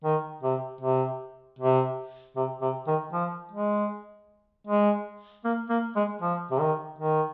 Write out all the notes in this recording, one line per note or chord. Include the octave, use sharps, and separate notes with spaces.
D#3
C3
C3
C3
C3
C3
D#3
F3
G#3
G#3
A#3
A#3
G#3
F3
C3
D#3
D#3